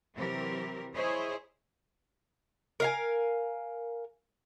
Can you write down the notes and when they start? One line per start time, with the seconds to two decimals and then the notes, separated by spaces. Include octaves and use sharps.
0.14 C3 E3 F#3 C4 G4 A#4
0.94 E4 G#4 C5 C#5 D#5
2.80 A#4 F5 G#5